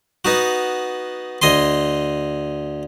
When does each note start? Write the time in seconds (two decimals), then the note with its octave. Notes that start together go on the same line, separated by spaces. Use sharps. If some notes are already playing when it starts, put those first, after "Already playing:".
0.25 B3 D#4 F#4
1.42 D2 D#5 G#5 C6